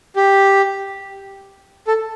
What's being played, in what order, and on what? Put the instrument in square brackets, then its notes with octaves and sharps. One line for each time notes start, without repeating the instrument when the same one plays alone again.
[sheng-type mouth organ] G4
A4